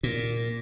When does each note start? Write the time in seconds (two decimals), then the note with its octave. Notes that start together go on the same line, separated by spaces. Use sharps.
0.03 A#2